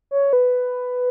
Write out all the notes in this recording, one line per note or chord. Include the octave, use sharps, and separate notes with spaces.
C#5
B4